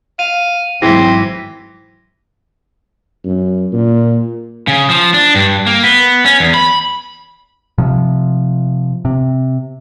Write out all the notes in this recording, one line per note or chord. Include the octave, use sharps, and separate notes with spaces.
F5 D#7
G#1 E3 F#3 G#3 C4 E4 A#6 B6
F#2
A#2
C#3
F3
D4
G2
A#3
B3
C#4
E2
B5
C3 F3
C3